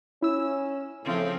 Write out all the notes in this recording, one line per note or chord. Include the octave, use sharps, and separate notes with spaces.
C#4 E4 E6
A2 C#3 F3 C4